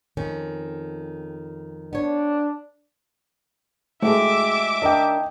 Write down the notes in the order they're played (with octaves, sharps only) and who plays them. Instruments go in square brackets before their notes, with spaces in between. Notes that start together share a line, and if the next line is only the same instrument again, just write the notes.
[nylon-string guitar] F2 D#3 C#4
[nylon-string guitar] B3 C#5 [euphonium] D4
[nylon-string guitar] G#3 F#4 G4 [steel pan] A3 [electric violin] E5 D6
[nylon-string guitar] D#3 D4 A#4 [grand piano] D#5 G5